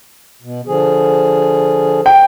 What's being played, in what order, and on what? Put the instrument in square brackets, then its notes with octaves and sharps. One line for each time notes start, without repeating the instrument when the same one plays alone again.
[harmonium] B2
D3 F3 G#4
[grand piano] G5